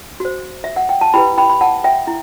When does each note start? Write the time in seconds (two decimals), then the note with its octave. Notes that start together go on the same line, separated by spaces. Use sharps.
0.20 F#4 C5
0.64 E5
0.76 F#5
0.89 G5
1.01 A5
1.14 E4 G4 B4 G5 B5
1.38 G5 B5
1.50 B5
1.61 F#5 A5
1.84 E5 G5
2.07 E4